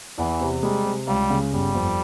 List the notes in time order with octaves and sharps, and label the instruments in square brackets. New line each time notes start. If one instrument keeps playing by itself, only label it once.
[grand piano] E2 [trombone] E3
[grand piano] C3
[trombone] G3 [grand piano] G#3
[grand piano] C3
[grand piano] C#2 [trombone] G3
[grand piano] C#3
[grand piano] G1 [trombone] G3
[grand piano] F2